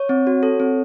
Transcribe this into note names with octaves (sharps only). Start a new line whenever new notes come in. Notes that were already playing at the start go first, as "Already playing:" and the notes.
Already playing: C#5
C4
F#4
A4
C4